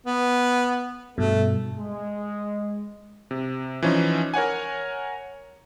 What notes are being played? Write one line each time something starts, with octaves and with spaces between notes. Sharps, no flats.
B3
G2 B2 A3
G#3
C3
E3 F3 C#4 D#4
A#4 C#5 F#5 G#5